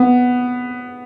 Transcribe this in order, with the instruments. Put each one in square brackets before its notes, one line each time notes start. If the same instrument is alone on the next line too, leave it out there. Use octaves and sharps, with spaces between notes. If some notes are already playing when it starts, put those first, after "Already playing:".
Already playing: [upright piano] B3